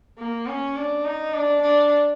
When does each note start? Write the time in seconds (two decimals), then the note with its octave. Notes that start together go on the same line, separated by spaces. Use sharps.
0.19 A#3
0.47 C#4
0.76 D4
1.05 D#4
1.34 D4
1.62 D4